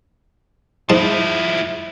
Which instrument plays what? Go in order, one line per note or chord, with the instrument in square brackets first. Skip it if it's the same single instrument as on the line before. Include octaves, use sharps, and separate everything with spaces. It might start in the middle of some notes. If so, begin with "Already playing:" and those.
[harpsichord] G#2 D#5 A5 [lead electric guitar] F3 E4